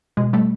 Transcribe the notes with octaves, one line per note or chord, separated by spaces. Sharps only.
B2 G#3
G3 A3